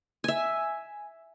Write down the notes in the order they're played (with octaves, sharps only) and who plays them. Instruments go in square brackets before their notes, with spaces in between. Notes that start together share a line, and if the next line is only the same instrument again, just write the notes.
[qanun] E5 G#5